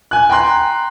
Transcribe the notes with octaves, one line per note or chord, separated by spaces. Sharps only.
G#5 F#6
G5 A#5 C6 F#6